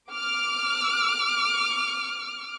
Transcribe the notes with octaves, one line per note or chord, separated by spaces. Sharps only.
D6 F6